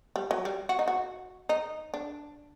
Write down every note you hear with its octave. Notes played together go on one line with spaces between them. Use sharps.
G3
F#3
G3
F#4
D#4
F#4
D#4
D4